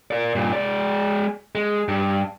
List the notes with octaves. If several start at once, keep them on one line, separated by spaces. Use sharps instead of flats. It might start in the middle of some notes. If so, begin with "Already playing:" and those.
A#4 D5
G2 A#2
G#3 D5
G#3
G2